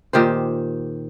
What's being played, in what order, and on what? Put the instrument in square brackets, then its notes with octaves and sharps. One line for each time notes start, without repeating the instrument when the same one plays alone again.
[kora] A#2 D#3 G4 C5